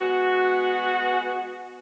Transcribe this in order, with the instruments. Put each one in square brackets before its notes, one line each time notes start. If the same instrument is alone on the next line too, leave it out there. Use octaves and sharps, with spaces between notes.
[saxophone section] G#3 B3 F#4